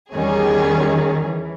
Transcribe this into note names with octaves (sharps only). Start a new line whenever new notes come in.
E2 D#3 G3 C#4 G#4
E3